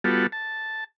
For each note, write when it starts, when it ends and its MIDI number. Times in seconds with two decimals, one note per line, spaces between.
0.04 0.27 55
0.04 0.27 59
0.04 0.27 65
0.04 0.27 66
0.04 0.27 69
0.32 0.84 81